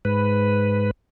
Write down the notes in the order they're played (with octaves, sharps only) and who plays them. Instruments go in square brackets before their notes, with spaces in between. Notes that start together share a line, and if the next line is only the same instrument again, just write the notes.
[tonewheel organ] G#2 B4